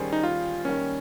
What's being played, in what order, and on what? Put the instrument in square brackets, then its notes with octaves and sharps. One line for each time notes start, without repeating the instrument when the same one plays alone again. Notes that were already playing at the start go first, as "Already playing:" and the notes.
Already playing: [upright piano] D#3 G3 C#4 G#4 C5
[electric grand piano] D#4
F4
[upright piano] D#3 G3 A#3 [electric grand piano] C#4